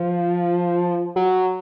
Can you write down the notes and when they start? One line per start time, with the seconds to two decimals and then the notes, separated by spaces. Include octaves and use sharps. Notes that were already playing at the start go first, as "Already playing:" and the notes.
Already playing: F3
1.16 F#3